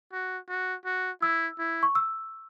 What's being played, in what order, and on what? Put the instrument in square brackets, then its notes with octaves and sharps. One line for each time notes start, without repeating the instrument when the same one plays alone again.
[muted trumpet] F#4
F#4
F#4
[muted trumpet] E4 [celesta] E6
[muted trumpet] E4
[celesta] C#6
E6